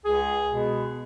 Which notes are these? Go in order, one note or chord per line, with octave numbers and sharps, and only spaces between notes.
C#2 G#4
B2 G#3 B3